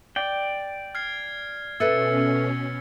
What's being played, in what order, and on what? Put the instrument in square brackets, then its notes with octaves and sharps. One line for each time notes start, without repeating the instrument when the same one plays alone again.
[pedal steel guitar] D5 G5
[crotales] F6 G#6 C7
[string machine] B2 C#4 [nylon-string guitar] A4 B4 E5 [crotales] E6 A6 C#7